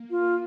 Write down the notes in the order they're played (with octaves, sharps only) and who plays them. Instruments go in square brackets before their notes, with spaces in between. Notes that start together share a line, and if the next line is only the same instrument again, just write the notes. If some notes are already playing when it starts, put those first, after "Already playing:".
Already playing: [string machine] A#3
[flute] F4